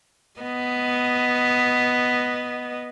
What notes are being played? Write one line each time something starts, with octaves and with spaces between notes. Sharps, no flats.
B3 D#5